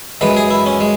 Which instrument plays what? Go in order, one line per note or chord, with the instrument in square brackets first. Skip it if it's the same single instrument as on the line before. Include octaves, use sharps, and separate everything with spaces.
[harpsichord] F#2 E3 G#3 B4
G#4
E4
C#4
G#3